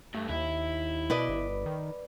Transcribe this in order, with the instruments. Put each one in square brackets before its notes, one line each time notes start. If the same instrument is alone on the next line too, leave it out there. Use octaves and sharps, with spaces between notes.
[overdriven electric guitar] G2 [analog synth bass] A3
[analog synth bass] D#2 [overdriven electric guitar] E4
[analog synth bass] B2 [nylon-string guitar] B4 D5 D#5
[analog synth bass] G1
D#3